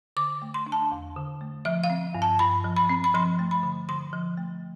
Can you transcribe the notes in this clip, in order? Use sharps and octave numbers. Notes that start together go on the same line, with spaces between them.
D3 D6
A3
C6
D4
A5
E2
D3
A3
F3 E5
F5
C4
G2
A5
G2 B5
F3
B5
C4
B5
F3 C6
A3
B5
D3
D3 C6
F3
A3